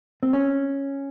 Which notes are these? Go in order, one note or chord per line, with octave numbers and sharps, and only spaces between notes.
C4
C#4